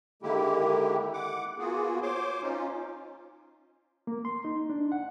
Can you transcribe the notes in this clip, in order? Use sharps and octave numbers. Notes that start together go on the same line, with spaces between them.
D3 D#3 G#3 A#3 E4 G4
F#5 D6
A#3 B3 F4 F#4 G#4
C5 C#5 C6 D6
C#4 D#4 F4
A#3
C6
D#4
D4
F#5